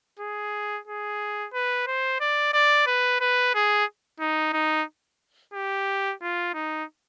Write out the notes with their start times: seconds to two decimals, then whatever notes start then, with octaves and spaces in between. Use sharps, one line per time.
0.20 G#4
0.88 G#4
1.53 B4
1.87 C5
2.21 D5
2.54 D5
2.87 B4
3.21 B4
3.55 G#4
4.20 D#4
4.54 D#4
5.54 G4
6.22 F4
6.54 D#4